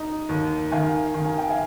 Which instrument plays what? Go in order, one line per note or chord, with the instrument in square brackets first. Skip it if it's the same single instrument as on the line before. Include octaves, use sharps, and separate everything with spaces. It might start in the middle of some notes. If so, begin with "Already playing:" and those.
Already playing: [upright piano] D#4
D#2
[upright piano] D#3 [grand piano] F5 G#5
[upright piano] D#3
[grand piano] G#5
G5
F5 G#5